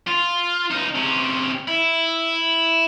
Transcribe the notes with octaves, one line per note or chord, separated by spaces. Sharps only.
F4
C#2 D#4
C3 C#4
E4